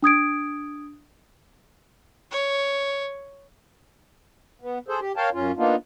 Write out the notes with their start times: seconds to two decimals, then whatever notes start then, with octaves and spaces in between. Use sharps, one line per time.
0.02 D4 D#6 G#6 D7
2.31 C#5
4.62 B3
4.88 G#4 A4 C5
5.00 G4
5.17 A#4 C#5 F5 G5 A5
5.33 F#2 C#4 F4
5.57 A#3 B3 D4 D#4 F4